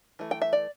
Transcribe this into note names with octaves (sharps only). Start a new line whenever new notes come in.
E3 A3
G5
E5
D5